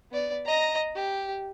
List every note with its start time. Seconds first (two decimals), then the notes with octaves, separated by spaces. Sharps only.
0.11 B3 D5
0.46 D#5 A#5
0.95 G4